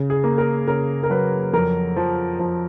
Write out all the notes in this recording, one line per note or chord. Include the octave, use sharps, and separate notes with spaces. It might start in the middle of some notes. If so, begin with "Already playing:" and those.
Already playing: C#3
G#4
A#3
A#4
C#3 A#4
A#4
F#3 B4
F2 A#4
F3
F3